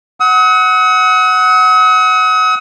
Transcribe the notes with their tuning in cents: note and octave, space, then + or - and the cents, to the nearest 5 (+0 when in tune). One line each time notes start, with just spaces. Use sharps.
F#5 +0 D#6 +45